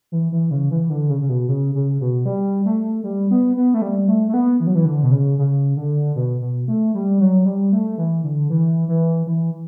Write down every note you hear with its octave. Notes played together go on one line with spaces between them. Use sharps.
E3
E3
C#3
E3
D3
C#3
C#3
B2
C#3
C#3
B2
G3
A3
G3
B3
B3
A3
G3
A3
A3
B3
E3
F#3
E3
D3
B2
C#3
C#3
D3
B2
B2
A3
G3
F#3
G3
A3
E3
D3
E3
E3
E3